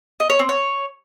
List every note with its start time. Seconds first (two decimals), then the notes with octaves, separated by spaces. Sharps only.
0.20 D#5
0.30 C#5
0.39 C4
0.49 C#5